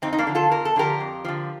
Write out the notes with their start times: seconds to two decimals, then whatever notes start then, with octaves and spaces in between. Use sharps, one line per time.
0.02 F2 C4 D#4
0.13 D#4
0.19 A#3 D4
0.27 D3 F3
0.35 F4 A4
0.51 F2 A#4
0.65 A4
0.76 D3 F3 G4 A#4
1.00 F2
1.25 D3 F3